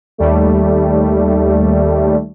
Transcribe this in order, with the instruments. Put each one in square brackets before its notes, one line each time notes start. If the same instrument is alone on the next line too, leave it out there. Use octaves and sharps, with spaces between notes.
[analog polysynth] D#2 G3 A3